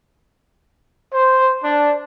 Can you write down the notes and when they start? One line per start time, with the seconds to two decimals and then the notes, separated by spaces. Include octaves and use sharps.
1.13 C5
1.64 D4